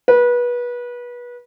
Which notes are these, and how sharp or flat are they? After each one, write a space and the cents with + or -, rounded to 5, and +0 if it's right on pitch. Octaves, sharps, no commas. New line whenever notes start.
B4 -25